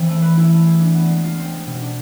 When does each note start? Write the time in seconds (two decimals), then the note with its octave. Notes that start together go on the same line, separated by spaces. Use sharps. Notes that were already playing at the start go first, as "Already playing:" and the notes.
Already playing: E3 C4
0.09 A3
0.22 B4
0.37 E4
0.52 A3
0.66 G#4
0.80 D4
0.95 B3
1.09 G#3
1.23 F4
1.38 C4
1.53 G#3
1.66 B2
1.82 D4